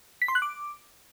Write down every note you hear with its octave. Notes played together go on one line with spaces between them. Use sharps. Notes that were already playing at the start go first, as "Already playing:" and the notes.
B6
C6
F#6
D6